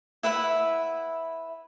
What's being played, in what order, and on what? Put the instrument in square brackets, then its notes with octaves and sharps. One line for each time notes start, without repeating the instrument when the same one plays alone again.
[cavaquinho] E4 B4 E5 F#5